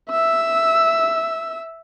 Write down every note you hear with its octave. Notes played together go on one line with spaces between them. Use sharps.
E5 E6